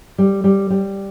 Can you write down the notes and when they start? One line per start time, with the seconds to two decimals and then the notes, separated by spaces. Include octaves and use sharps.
0.18 G3
0.44 G3
0.70 G3